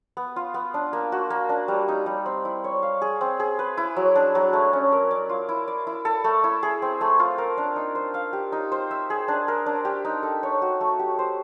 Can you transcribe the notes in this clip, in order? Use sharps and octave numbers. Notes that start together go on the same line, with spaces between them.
B3
F4
B3
D4
A#3
F#4
A#3
D4
G3
D#4
G3
C4
E4
C#5
F5
G#4
C4
G#4
B4
E4
F#3
D4
F#3
A3
C#4
A#4
D5
F4
E4
D5
E4
A4
A3
E4
G#4
C4
A3
F4
A#4
D4
D#4
C5
F5
G4
D#4
C5
E5
G#4
D4
A#4
D4
G4
D#4
A4
C#5
F#4
A3
G4
C5